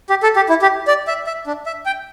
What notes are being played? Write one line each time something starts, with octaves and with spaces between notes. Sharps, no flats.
G4
A4
G4
E4
G4
D5
E5
E5
D4
E5
G5